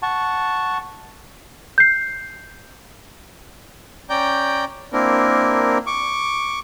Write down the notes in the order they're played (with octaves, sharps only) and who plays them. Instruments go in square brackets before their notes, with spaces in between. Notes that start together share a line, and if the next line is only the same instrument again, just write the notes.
[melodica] F#5 A5 C#6
[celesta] G6 C7
[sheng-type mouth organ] C#4 D5 G5 A#5 G6
A#3 C4 D4 E4 A#4
C#6 D6